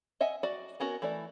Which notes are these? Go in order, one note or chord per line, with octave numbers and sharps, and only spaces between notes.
D#5 E5 F#5 G#5
F#4 D5
B3 C#4 F#4 A#4
E3 A3 E4 D5